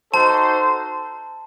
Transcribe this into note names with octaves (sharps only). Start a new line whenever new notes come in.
D#4 F#4 A4 C5 A5